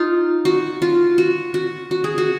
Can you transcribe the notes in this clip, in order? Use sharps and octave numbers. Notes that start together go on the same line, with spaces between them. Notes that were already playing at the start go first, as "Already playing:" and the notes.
Already playing: D#4 F4
F#4
F4
F#4
F#4
F#4
G#4
F#4